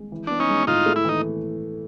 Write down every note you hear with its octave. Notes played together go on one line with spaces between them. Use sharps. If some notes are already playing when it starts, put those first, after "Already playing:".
Already playing: G#3
E3
B3 D4
C#4 D#4
G#3
A2 D#4 F4
A3
E4
E3 D#4